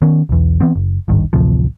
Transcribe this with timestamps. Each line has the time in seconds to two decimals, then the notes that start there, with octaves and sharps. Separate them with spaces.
0.02 D#3 B3 C#4
0.29 B1 E2
0.60 E3 B3 C4
0.76 F#1
1.08 D1 G#1 G2 D#3
1.33 A1 D2 C3 F3